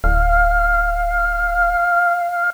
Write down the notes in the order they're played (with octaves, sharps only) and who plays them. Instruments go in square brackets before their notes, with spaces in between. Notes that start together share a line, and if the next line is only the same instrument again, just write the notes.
[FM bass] D1 [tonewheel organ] F5